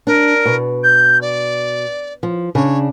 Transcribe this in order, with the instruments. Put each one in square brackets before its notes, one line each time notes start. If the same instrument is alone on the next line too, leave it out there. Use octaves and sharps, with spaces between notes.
[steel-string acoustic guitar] D4 [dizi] A#4
[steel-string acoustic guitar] B2
[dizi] G6
D5
[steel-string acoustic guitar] F3
[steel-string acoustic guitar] C#3 D4 [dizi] C#5